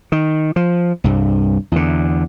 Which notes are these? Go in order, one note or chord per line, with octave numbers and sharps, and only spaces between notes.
D#3
F3
C2 G2
E2 D3